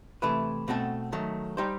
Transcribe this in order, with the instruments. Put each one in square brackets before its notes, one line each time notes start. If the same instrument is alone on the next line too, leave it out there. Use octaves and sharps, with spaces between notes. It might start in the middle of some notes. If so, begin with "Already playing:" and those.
[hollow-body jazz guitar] C3 E3 A3 E4 B4
B2 A3 C4 F#4 A4
D#3 F#3 A3
G3 D#4 G4 C5